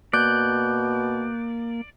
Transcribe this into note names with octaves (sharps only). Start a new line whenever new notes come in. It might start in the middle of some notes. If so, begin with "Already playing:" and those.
B2 A#3 D5 F#6 G6